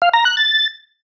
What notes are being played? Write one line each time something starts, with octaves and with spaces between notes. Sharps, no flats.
F5
A#5
F#6
A6